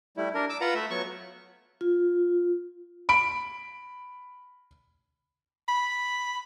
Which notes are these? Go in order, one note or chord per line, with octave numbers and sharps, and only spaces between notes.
G3 A3 E4
D4 A#4
D6 E6
F4 B4 F#5 A#5
A3 E5
F#3 B3 C#6
F4
B5 D7
B5